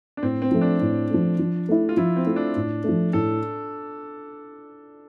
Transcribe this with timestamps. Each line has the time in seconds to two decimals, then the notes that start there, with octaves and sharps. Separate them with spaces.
0.17 D4
0.22 A2 C4
0.42 C4
0.51 F3 A3
0.61 D4
0.81 A2
1.10 F3 A3
1.39 F3
1.69 A3 E4
1.89 F4
1.97 F3 E4
2.16 C4
2.26 A3 E4
2.36 D4
2.56 A2
2.84 F3 A3
3.13 A2 A4